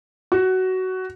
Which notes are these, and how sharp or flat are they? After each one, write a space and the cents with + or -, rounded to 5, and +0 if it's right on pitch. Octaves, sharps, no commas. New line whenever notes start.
F#4 +15